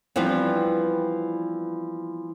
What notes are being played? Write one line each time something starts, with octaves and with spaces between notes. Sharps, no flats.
E3 F3 G3 B3 C4 D4